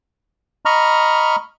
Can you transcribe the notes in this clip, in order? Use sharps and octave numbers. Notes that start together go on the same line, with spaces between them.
D#5 A#5 B5 C#6 F6